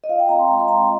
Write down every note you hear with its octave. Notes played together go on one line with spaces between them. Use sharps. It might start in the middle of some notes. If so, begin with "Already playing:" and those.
D#5
F4 F5
G5
C4 A#5
C6
G#3 A#5
C6
C4 A#5
C6